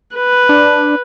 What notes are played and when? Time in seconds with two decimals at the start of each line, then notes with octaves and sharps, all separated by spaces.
0.16 B4
0.49 D4